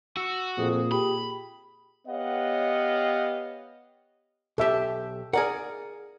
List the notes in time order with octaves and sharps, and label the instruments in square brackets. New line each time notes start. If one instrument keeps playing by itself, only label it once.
[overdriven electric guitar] F#4 [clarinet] E6
[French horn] F2 [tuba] A#2 [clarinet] G#4
[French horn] G4 [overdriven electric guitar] B5
[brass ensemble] B3 G4 C#5 D#5 F5 F#5
[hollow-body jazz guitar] B1 G4 [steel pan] A4 E5
[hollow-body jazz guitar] G#4 D5 F#5 [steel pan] A#4